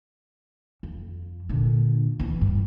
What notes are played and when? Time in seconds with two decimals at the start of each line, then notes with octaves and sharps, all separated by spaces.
0.83 F2
1.49 A#2 D3
2.19 E3 B3
2.41 G2